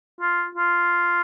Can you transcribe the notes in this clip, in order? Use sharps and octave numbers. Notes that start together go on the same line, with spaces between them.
F4
F4